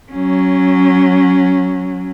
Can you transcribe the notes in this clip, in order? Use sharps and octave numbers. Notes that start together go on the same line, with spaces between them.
F#3 C#4